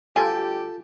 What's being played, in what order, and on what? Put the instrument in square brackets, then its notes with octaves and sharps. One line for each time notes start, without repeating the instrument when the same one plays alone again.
[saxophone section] D2 G3 G4 [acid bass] F4 [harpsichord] A4 [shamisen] G#5